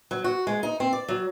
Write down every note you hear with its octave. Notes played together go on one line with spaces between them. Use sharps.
F#3
F#4
G#3
D#4
C4
D5
F#3